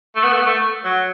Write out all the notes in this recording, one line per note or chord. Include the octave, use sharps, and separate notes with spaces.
A3
B3
A3
B3
A3
F#3